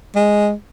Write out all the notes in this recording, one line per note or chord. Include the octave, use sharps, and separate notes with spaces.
G#3